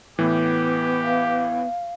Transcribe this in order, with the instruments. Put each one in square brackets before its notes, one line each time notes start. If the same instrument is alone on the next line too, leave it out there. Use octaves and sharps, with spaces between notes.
[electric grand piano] A2 E3 [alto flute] B3 [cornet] G4
[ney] F5